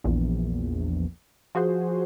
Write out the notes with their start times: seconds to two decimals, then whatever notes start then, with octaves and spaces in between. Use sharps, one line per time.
0.04 A#1 E2
1.55 F3 F#4 G#4 C5